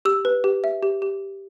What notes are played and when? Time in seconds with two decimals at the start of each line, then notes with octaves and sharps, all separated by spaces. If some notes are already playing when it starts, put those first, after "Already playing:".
0.05 G4 E6
0.25 B4
0.44 G4
0.64 E5
0.83 G4
1.02 G4